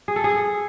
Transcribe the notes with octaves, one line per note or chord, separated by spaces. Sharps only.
G#4
A4
G#4